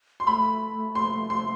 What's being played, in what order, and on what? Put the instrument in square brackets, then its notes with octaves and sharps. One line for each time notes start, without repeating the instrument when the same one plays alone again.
[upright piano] C6
[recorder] A3 [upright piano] B5
[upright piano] C6
C6